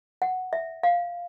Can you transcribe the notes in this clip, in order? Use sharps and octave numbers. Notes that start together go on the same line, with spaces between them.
F#5
E5
F5